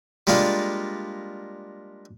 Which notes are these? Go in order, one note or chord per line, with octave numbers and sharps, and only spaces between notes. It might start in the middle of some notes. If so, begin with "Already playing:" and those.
G3 G#3 A#3 D4 F4